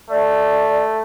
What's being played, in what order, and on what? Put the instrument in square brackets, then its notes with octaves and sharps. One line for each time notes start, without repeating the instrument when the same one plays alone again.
[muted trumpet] A3 [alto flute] D5